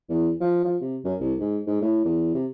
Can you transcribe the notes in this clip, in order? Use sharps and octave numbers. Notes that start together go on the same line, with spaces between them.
E2
F3
F3
C3
F#2
C2
G#2
G#2
A2
E2
C3